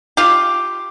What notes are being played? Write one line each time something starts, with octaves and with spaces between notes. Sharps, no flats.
F4 G4